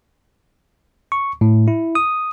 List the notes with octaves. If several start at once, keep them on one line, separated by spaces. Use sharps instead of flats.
C#6
A2
E4
D#6